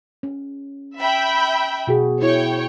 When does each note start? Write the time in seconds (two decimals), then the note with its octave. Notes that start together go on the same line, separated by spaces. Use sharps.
0.23 C#4
1.00 E5 G5 B5
1.87 B2 F#4 G#4
2.22 E4 C#5 G5